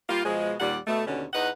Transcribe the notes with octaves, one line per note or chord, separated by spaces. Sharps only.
G3 A#3 F4
B2 F3 G#3
D#2 A#2 G3 D5 F#5
B2 A3
D#2 B2 D3 C#4
E2 D#4 B4 F#5